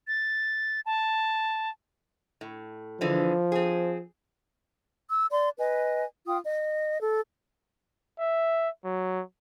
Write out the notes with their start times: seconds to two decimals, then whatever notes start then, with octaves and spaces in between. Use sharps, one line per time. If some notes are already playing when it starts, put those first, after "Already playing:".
0.08 A6
0.86 A5
2.41 A2
3.01 D3 E3 F3 G#3
3.52 C4 G#4
5.09 E6
5.31 D5 C6
5.58 B4 D#5 G#5
6.26 F4 G5 D#6
6.44 D#5
7.00 A4
8.20 E5
8.85 F#3